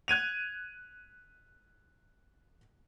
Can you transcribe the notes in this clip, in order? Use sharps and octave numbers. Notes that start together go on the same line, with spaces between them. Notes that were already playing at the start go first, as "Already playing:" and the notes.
F#6 G#6 D#7 F7